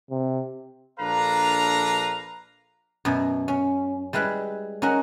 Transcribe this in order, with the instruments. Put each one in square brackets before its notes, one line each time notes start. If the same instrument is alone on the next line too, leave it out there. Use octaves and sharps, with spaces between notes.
[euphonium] C3
[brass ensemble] A#1 D4 A4 B4 F5 A#5
[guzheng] F#2 B2
C#4
G3 G#3 E4 B4
C#4 D#4 F#4 A#4